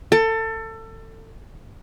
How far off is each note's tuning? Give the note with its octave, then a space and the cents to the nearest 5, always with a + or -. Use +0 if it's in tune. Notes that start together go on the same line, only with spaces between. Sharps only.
A4 +25